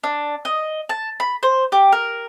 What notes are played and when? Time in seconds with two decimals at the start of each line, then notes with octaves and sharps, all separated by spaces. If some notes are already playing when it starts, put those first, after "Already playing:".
0.04 D4
0.45 D#5
0.89 A5
1.20 B5
1.43 C5
1.72 G4
1.92 A#4